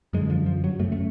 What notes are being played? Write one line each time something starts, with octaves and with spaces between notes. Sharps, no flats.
F#2 D3 G#3
F3
F3
F#3
F#2 C#3 A3
A3